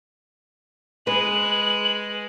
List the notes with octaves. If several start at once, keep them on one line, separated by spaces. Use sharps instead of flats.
G#3 B4 F#7